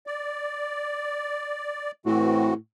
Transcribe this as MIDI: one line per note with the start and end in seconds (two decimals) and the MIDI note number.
0.07 1.91 74
2.06 2.54 45
2.06 2.54 52
2.06 2.54 60
2.06 2.54 66